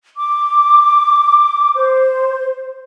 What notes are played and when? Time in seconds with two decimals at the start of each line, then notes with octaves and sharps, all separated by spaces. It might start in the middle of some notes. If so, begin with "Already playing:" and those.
0.17 D6
1.75 C5